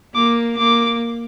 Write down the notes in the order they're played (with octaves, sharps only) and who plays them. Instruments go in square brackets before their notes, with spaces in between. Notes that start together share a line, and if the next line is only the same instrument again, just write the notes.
[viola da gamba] A#3 [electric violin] D6
[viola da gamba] A#3 [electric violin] D6